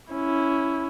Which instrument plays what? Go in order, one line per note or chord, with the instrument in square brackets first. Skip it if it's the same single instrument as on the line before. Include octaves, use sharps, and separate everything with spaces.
[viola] C#4 E4